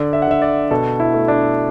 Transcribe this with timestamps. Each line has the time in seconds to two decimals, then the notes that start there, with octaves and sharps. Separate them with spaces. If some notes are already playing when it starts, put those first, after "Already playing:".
Already playing: D3 D5
0.13 E5
0.22 F#5
0.27 D3 E5
0.42 D5
0.71 B2 A4
1.00 E4
1.14 A3
1.28 D4